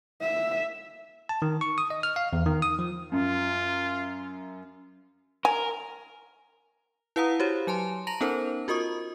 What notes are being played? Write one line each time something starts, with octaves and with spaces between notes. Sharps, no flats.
E5
A5
D#3
C#6
D#6
D#5
F6
F5
E2
D#3
D#6
F3
F#2 F4
A#4 G#5
E4 B4 F5 F#5 A#5 D#6
F#4 G4 C5 C#5
F#3 G#5 A5 C6
A5 A#5 A#6 F7 F#7
B3 C#4 D#4 A4 A#4 C5
F4 F#4 A#4 D#5 C#6 D#6